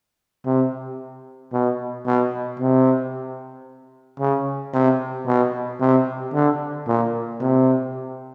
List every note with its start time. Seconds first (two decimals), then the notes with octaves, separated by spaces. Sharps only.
0.45 C3
1.52 B2
2.06 B2
2.59 C3
4.19 C#3
4.73 C3
5.26 B2
5.80 C3
6.33 D3
6.87 A#2
7.40 C3